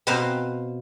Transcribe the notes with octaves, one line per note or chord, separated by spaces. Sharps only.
B2 C4 B4 C5 F5 A#5